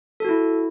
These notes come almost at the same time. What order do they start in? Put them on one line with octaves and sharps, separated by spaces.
A4 F#4 E4